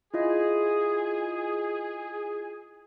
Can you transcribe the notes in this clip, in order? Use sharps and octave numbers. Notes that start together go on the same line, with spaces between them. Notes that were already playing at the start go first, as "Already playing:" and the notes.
E4 F4 G#4 D#5